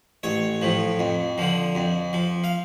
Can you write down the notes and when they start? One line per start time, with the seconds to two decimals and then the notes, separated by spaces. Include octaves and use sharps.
0.23 A1 C#5
0.62 A2 F3
0.99 F2
1.38 D3 F3
1.75 F2
2.13 F3
2.44 F5